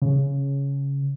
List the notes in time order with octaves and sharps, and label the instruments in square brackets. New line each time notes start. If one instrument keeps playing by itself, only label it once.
[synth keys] C#3